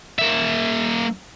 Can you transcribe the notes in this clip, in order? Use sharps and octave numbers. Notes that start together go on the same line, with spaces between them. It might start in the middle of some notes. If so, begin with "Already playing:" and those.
A#3 E5